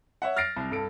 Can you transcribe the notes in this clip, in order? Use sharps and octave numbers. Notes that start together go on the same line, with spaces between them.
C#5 E5 F#5
F6 A6 A#6 C7 D7
C2
G2 A4 D7